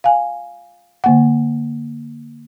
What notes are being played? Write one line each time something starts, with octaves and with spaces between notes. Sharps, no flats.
F5 G#5
D3 A#3 F#5